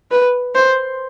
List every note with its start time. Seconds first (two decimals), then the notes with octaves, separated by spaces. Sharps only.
0.11 B4
0.55 C5